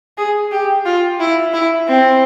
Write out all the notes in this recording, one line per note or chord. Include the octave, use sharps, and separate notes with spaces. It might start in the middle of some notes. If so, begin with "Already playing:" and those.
G#4
G4
F4
E4
E4
C4